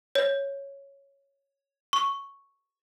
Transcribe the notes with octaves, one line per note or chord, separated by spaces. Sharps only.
C#5
C#6